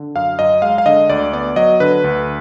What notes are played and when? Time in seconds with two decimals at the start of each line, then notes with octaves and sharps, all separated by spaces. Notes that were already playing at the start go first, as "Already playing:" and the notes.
Already playing: D3
0.15 F#2 F5
0.39 F#2 D#5
0.62 G#3 F5
0.78 F5
0.86 D3 D#5
1.10 D2 D5
1.33 B3 D5
1.56 F#3 D#5
1.80 D3 B4
2.04 D2